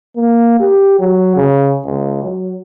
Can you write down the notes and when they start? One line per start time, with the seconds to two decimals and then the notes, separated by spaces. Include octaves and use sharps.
0.16 A#3
0.60 G4
1.00 F#3
1.36 C#3
1.85 C#2
2.23 F#3